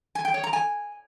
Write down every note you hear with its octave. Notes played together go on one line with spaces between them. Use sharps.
G#5
G5
C#5
A#5
G#5